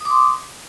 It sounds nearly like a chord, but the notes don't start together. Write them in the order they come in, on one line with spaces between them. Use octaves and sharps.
D#6 D6 C6